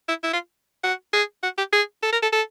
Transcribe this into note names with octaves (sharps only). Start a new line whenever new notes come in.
E4
E4
F4
F#4
G#4
F#4
G4
G#4
A4
A#4
A4
A4